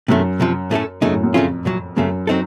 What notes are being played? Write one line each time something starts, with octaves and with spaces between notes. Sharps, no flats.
F#2 C3 D#3 A3
C2 C3 F3
A2 A3 C#4 A4
F#2 C#3 A3 D#4
A2
F#2
F2 C#3 A3 C#4 F4
C2 A#2 F#3
C#2 F#2 C#3 A3
F#3 C4 D#4 A4